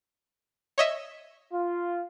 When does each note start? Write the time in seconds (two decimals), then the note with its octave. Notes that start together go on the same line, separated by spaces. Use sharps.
0.78 C#5 D#5 E5
1.52 F4